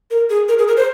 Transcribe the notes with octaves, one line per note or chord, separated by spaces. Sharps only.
A#4
G#4
A#4
G#4
A#4
C5